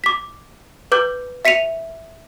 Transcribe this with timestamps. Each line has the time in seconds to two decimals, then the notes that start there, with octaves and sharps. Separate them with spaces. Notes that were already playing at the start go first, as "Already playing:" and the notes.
0.04 D6 B6
0.92 B4 D6 G6
1.45 E5 B6 C#7 D#7 F7